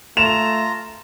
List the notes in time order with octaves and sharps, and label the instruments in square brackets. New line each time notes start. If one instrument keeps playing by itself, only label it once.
[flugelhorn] A3 [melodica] F4 A#5 [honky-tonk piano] E7 F7